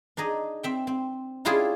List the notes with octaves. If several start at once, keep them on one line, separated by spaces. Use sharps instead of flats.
D4 D#4 G#4 D#5
C4 E5 G5
C4
C#4 D4 E4 F4 G4 G#4